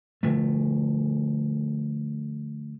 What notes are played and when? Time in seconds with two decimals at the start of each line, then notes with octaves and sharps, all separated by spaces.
0.23 D3 F3 A3